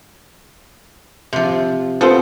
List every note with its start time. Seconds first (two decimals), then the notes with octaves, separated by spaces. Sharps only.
1.33 C3 F3
2.01 B3 C4 F4 A4 C5